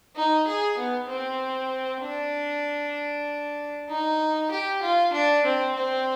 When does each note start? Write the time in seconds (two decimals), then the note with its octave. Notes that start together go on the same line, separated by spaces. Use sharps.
0.16 D#4
0.47 G#4
0.77 B3
1.09 C4
2.02 D4
3.89 D#4
4.51 G4
4.82 F4
5.13 D4
5.44 C4
5.75 C4